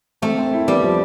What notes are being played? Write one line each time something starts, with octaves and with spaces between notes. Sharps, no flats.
A3 C4
C4
E4
G3 B3
F3